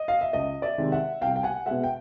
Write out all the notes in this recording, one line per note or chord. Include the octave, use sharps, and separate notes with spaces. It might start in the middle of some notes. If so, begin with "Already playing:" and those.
Already playing: D#5
F5
E5
C#2 D#5
D5 E5
C3 D#3 G#3
E5 F#5
C2 F5 G5
G5
F#5 G#5
B2 G#3 E5 F#5
G5